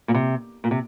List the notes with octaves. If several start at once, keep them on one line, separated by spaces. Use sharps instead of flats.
A#2
C3
A#2
C3